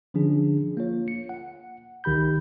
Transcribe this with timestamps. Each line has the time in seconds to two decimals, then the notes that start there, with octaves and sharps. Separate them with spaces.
0.14 D3 F3 C#4 D4 G#4
0.77 A#3 F4 C#5
1.08 C#7
1.29 F#5
2.04 C#2 D#3 G4 B5 G6